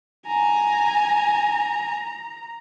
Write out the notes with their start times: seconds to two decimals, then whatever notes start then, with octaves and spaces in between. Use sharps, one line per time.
0.27 G#5 A#5